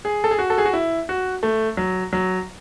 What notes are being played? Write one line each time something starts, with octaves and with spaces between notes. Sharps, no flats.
G#4
A4
G#4
F#4
A4
G#4
F#4
E4
F#4
A3
F#3
F#3